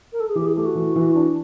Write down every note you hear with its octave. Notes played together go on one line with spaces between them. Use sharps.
A#4
A4
G#4
E3 G4
G#4
A3 G4
F#4
E3
E3
D4